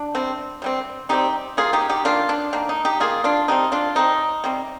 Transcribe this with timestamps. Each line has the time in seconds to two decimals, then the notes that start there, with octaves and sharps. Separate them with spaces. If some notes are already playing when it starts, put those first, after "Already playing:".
Already playing: D4
0.15 C3 G3 C4
0.62 C3 G3 C4
1.09 C3 G3 C4 D#4 G4
1.57 D#3 A#3 F4 G#4
1.73 D#4 G4
1.89 D#4 G4
2.05 D#3 A#3 D4 F4
2.29 D4
2.53 D#3 A#3 D4
2.69 D#4
2.85 D#4 G4
3.00 D#3 A#3 F4 G#4
3.24 D4 F4
3.48 C3 G3 C4 D#4
3.72 D4 F4
3.95 C3 G3 C4 D#4
4.44 C3 G3 C4